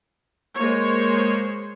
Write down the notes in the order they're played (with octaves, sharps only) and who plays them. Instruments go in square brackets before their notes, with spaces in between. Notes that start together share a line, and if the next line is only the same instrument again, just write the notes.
[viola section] G#3 A#3 C5 C#5